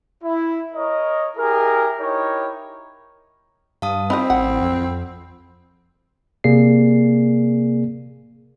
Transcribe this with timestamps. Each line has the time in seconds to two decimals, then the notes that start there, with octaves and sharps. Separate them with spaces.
0.24 E4
0.74 A#4 C#5 D#5
1.37 E4 G4 G#4 A#4
2.00 D#4 E4 G4 A#4 C#5
3.82 G2 F5 A5 D#6
4.10 C4 D#4 F4 D#5 B5
4.30 A1 F#5
4.61 F2
6.44 C3 A#3 G#4 D5 C7